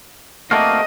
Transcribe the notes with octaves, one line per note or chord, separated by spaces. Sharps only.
A3 A#3 C4 F#4 D5 D#5 F5